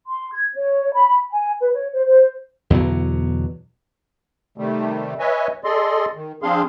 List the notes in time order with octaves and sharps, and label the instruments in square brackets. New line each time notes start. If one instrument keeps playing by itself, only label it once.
[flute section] C6
G#6
C#5
B5
G#5
B4
C#5
C5
C5
[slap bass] E2 B2 D3 F#3
[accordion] C3 D#3 G3 A3
B4 C#5 D#5 E5 G#5
G#4 A4 D5 D#5 C6
D#3
F3 C4 D4 G#4 F5 C6